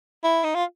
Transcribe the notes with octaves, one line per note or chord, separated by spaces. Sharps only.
E4
D#4
F4